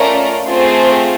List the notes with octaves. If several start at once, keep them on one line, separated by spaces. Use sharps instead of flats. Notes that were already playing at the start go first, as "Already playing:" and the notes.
Already playing: A3 C#4 F4 A#4 D5
A3 C4 F4 G#4 C5